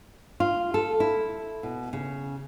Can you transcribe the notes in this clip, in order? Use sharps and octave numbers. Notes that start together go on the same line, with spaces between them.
F4
A4
E4
B2
C#3